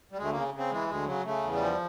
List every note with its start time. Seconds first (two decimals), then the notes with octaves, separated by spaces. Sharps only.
0.12 G3
0.18 D2 G#3
0.24 A3
0.31 C#3 A#3
0.54 C#3 C4
0.71 E3 G#3
0.89 D2 G#3
1.07 C#3 F#3
1.25 C#3 A3
1.43 E2
1.53 G3
1.61 F3